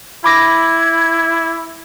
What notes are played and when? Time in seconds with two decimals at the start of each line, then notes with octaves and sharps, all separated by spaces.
0.24 E4 B5 D6 G#6 A#6